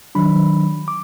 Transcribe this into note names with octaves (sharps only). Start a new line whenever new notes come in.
D#3 F#3 D4 B5
D6